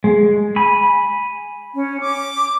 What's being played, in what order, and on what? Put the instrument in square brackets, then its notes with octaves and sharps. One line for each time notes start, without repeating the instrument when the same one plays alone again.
[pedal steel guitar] G#3
G#5 B5
[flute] C#4
D6